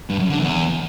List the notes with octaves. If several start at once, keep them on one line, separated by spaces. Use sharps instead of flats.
G2
F#2
D3
E2